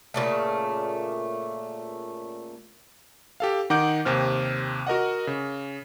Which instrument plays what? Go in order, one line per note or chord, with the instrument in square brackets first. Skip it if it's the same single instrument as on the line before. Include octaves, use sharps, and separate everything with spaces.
[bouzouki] A#2 C#3 A3
[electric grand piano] G4 A4 F5
D#3 D#4 F#5 D6 G6 D7
D#2 C3 C4 F6
F#4 A#4 D#5 F#5
C#3